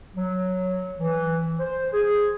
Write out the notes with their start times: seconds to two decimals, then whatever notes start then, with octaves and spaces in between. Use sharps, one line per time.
0.16 F#3
1.00 E3
1.59 C5
1.93 G#4